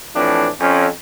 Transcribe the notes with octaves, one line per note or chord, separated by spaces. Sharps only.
A2 E3 F3 C4 D4
F2 C#4